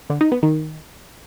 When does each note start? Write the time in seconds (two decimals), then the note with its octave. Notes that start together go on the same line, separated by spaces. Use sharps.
0.10 D3
0.21 D#4
0.32 B3
0.43 D#3